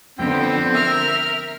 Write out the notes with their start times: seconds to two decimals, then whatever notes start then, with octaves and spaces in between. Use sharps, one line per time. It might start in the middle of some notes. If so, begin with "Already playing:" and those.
0.18 F2 D3 B3 C4 G5
0.74 A#4 E5 F6